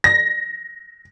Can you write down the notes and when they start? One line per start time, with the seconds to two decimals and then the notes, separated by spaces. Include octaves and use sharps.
0.04 A#6